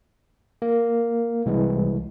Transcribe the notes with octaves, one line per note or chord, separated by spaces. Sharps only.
A#3
C2 E3 G#3